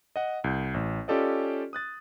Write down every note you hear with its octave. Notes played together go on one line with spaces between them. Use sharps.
D#5 F#5
C2 G6
A1
C#4 F4 G4 A4 D5 D#5
D#6 F#6 A6